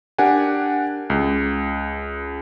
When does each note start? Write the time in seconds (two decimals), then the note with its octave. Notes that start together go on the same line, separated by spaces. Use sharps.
0.18 D4 G4 A#4 F#5 G#5
1.10 C#2